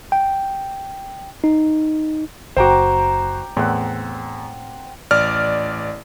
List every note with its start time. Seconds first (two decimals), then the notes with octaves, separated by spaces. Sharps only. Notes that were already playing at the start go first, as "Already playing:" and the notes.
0.12 G5
1.44 D#4
2.57 F#1 F#4 C5 G5 A#5 D6
3.56 E2 A2 C4 F#5
5.11 A1 D5 F6